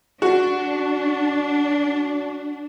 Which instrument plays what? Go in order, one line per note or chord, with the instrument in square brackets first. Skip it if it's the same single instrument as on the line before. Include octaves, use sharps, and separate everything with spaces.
[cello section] D4 [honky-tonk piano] F#4